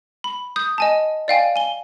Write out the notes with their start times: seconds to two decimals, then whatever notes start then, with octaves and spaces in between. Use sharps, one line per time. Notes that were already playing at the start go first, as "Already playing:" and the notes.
0.24 B5
0.56 D#6 G6
0.78 D#5 G#5 A5
1.28 D5 F5 G5 G#5
1.56 G#5 G7